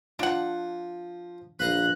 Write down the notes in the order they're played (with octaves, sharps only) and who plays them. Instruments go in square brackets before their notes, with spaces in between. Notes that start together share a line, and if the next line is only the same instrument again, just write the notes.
[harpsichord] F3 [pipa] D4 F#5
[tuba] A#1 [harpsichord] B4 F5 A#5 [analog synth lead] F#6